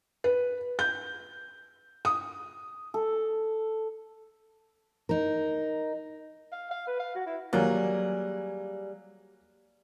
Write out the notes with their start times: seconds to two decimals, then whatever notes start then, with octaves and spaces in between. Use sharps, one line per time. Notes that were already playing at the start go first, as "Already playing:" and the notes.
0.24 B4
0.79 G6
2.05 D#6
2.94 A4
5.09 D#4 A#4
6.52 F5
6.71 F5
6.87 B4
7.00 F5
7.15 F#4
7.26 E4
7.53 F#3 G3 A#3 G#4